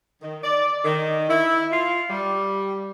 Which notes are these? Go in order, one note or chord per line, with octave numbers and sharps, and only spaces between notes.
D#3
D5
D#3
E4
F4
G3